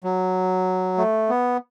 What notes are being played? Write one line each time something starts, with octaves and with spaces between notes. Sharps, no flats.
F#3
A3
B3